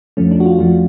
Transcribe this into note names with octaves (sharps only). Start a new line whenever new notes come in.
F2 F3 A3 C#4
D4
F#4
F4
F2 F3 A3 F#4